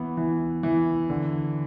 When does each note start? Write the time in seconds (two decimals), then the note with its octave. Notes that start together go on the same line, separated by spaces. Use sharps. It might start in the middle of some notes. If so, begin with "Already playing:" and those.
Already playing: E3 B3
0.17 E3
0.63 E3
1.10 D3